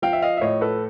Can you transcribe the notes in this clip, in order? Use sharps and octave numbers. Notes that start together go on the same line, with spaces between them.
F3 F5 G5
E5
D#5 F5
E5
A2 C#5 D#5
A4 B4